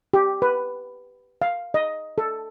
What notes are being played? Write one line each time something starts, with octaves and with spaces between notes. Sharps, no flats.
G4
B4
F5
D#5
A4